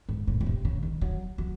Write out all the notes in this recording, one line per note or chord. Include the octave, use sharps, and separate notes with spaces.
G#2
A2
A2
C3
C#3
D#3
F#3
F#3